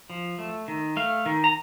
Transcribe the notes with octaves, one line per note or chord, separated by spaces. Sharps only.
F3
A3
D#3
A3 F5
D#3
A#5